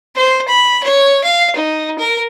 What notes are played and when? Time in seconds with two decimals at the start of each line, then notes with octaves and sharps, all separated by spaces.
0.15 C5
0.48 B5
0.83 C#5
1.24 F5
1.56 D#4
1.98 A#4